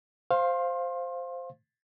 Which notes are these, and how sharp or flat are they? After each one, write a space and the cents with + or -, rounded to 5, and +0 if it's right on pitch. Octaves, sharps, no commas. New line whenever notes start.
C5 +0 F5 +0 C6 +30